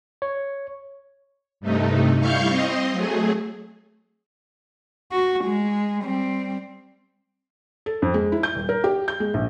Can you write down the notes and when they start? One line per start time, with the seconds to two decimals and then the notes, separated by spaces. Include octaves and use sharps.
0.22 C#5
1.60 G2 C3 A3 D#4
2.19 G3 E4 F5 C#6 F6 G6
2.49 C4 D#5 C6
2.92 F#3 A3 G#4
5.12 F#4
5.45 G#3
6.04 G3 C4
7.86 A4
8.02 F2
8.14 G#3
8.32 E4
8.43 G6
8.55 D#1
8.69 A#4
8.84 G4
9.08 G6
9.20 G#3
9.34 A#1